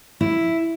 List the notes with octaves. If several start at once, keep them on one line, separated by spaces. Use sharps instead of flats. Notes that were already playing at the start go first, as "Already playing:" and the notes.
E4